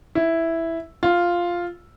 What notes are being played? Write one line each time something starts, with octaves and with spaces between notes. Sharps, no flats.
E4
F4